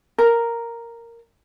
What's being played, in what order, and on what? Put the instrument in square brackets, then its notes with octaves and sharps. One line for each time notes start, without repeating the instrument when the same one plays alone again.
[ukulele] A#4